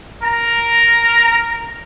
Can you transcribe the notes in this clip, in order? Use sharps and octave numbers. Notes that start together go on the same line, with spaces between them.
A#4 A#5